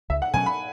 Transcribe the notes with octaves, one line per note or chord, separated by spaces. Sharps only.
C#2 E5
F#5
B2 F#3 C#4 G#5
B5